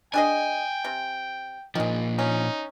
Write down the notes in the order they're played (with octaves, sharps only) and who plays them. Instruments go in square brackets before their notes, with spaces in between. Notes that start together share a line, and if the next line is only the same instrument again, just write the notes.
[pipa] D4 G#4 D#5 [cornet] G5 [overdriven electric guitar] G#5
[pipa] C3
[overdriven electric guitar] A#2 F3 [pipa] D#3 G#3
[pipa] C#4 [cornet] D#4